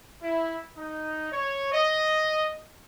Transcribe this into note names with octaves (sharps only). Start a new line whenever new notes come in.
E4
D#4
C#5
D#5